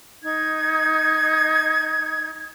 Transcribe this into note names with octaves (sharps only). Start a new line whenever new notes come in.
D#4 G#6